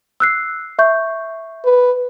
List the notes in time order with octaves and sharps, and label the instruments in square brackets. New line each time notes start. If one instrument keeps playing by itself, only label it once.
[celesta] E6 F#6 C7
E5 C#6 G6
[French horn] B4